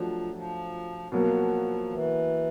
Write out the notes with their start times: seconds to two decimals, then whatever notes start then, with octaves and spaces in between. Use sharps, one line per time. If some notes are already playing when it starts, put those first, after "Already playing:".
Already playing: F3 F#3 A3 D4 G4
0.34 F3
1.12 B2 F3 F#3 A#3
1.91 E3